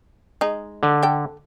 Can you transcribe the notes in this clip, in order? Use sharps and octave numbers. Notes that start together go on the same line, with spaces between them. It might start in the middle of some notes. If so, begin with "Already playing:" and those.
G#3 D#4
D3
A4 G5